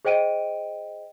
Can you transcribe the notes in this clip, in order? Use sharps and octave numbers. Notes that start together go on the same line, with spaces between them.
G#4 C5 D#5 G5 D7 D#7